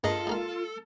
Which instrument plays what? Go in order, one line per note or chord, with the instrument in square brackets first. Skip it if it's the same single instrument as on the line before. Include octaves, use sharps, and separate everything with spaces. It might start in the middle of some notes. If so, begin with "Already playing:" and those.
[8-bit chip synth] G2 G#4 D#5 [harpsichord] A#3 [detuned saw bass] F4 [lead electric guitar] A4
[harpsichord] G#2 A#3 F5